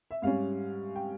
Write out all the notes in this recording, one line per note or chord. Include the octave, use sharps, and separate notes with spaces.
E5
G#2 G3 C#4 F5
G5